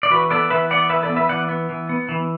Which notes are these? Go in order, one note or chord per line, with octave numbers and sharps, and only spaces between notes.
D5
E3 F#4 B4
B3 A4 D5
E3 B4 E5
B3 D5 F#5
E3 B4 E5
A4 D5
B3
B4 E5
E3 D5 F#5
B3
E3
B3
E3